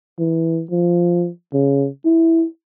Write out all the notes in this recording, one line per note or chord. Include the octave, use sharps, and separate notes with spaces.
E3
F3
C#3
E4